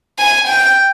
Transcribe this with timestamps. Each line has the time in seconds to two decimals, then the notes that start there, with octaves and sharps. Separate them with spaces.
0.19 G#5
0.47 G5